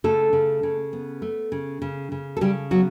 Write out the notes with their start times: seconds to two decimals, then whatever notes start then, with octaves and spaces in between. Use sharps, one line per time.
0.04 C#3 A3 A4
0.33 C#3
0.63 C#3
0.93 B3
1.22 A3
1.52 C#3
1.82 C#3
2.12 C#3
2.37 A4
2.41 C#3 G3 G4
2.71 F#3 B3 F#4